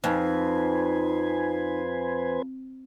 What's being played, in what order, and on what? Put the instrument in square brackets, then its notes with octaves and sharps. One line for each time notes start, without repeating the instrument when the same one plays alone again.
[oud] F2 [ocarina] D#4 [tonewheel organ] B4 C5 G#5